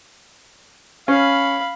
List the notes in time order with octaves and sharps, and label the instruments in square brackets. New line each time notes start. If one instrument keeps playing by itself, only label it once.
[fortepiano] C#4 [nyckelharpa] F5 B5